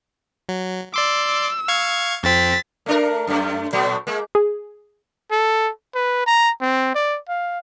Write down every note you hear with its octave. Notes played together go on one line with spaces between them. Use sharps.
F#3
D5 C6 D6 E6
F5 C#6 G#6
F2 C4 A6 B6
A3 D4 A#4
F#2 A3
A#2 F#3 A3
G#3 A#3
G#4
A4
B4
A#5
C4
D5
F5